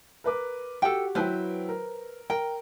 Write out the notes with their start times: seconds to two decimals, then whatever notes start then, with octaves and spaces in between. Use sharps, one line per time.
0.24 A#4 B4 D6
0.82 F#4 G4 A4 G5
1.15 F#3 E4 B4 C5 G5
1.69 A#4
2.30 A#4 G5